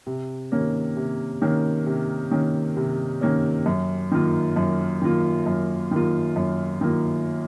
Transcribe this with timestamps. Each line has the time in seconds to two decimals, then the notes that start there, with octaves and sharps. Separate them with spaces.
0.07 C3
0.52 D#3 A#3 C#4
0.96 C3
1.42 D#3 A#3 C#4
1.86 C3
2.31 D#3 A#3 C#4
2.77 C3
3.21 D#3 A#3 C#4
3.66 F#2
4.11 D#3 A#3 F4
4.56 F#2
5.01 D#3 A#3 F4
5.46 F#2
5.91 D#3 A#3 F4
6.36 F#2
6.81 D#3 A#3 F4